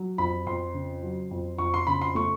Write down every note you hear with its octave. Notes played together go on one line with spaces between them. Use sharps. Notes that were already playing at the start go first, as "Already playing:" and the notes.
Already playing: F#3
F2 B5
F2 C6
C#3
F#3
F2
F2 C#6
C6
C#3 B5
C6
A3 C#6